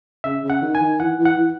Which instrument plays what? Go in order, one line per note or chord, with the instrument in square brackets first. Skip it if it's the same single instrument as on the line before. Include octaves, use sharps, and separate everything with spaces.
[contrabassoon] C#3 [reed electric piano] E5
[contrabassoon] C#3
[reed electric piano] F#5
[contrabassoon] D#3
[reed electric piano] G#5
[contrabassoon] D#3
[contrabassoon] E3 [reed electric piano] F#5
[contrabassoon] E3
[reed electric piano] F#5
[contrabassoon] E3